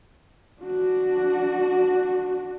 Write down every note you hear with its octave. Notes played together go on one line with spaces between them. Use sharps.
D4 F#4